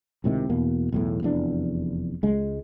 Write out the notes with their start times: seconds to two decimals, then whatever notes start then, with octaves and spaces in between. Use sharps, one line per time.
0.24 C#2 A2 C3 D#3
0.49 E2 B2 A#3
0.92 B1 E2 A2
1.23 F1 E2 D4
2.23 C#2 G#3